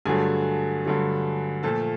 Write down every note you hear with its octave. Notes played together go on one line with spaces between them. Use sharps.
G2 D3 F#3 A3 G#4 G#5
G2 D3 F#3 A3
A#2 F3 A3 A4 A5